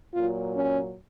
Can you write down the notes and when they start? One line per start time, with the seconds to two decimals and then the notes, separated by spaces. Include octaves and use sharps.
0.14 A#2 F#3 F4
0.54 C#4